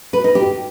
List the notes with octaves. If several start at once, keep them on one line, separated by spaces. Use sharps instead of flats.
B4
D#4
G4